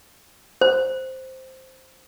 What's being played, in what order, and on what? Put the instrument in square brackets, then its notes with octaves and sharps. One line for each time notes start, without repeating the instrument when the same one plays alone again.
[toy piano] C5